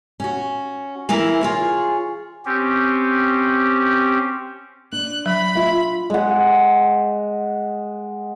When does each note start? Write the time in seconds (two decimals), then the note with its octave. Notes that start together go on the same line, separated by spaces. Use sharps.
0.20 C#4 F#4
1.09 E3 A#3 E4 A#4
1.41 F4 G#4 C#5
2.45 C4 C#4 G4
4.92 D4 F#6
5.26 F#3 B5
5.55 F4 E5
6.10 G#3 F#5